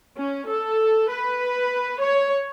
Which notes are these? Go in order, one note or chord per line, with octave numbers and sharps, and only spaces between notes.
C#4
A4
B4
C#5